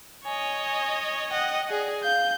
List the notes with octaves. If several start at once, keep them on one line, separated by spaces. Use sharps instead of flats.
C#5 D#5 G#5
D#5 F#5 G5
G#4 D5
F5 G6